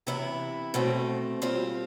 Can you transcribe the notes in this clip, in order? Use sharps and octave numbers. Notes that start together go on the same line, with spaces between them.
C3 E3 B3 E4
B2 A3 C4
G3 C4 F4